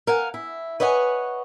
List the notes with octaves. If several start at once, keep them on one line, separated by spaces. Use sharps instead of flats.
A#4 F5 F#5 G#5
E4
B4 C#5 D#5 F#5 G#5